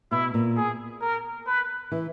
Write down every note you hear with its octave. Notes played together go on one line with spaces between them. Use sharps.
B2 E4
A#2
G#4
A#4
B4
E3